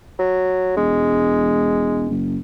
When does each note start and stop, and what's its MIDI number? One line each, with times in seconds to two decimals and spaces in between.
0.19 0.76 54
0.77 2.07 28
0.77 2.15 56
2.10 2.38 30